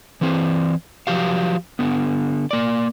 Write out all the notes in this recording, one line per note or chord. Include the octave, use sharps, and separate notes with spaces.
E3 C4
F3 F#3 G4 F5
D3 B3
A#3 D5